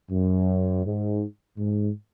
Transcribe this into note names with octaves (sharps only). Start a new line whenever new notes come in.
F#2
G#2
G#2